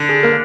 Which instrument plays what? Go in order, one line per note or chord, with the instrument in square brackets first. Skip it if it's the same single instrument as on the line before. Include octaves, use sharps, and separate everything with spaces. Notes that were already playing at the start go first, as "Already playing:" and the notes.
Already playing: [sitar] D3
[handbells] G#4
A#3 A#4